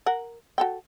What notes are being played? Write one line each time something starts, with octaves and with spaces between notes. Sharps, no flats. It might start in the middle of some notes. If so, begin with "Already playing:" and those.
A#4 F#5
F#4 A4 G5